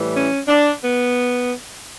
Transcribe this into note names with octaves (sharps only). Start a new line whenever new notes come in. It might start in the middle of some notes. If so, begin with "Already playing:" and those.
Already playing: A2 E3 G3
C#4
D4
B3